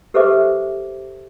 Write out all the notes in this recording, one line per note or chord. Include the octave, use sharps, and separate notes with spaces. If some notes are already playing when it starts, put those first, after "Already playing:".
G4 A4 B4 C5 E5 D6